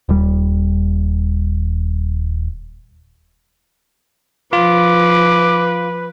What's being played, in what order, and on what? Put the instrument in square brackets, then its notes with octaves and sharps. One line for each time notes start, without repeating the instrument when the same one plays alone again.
[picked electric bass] D#1 G3
[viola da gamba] F3 [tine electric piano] F4 [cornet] B4 [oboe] D6